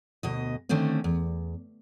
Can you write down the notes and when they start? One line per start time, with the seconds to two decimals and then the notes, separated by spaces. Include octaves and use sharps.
0.23 D2 B2 D#5
0.69 D3 D#3 A3 C4 C#4
1.04 E2